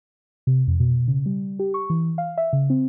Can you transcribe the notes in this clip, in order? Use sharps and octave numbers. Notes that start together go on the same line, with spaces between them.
C3
F2
B2
C#3
G3
G4
C#6
E3
F5
E5
C#3
C4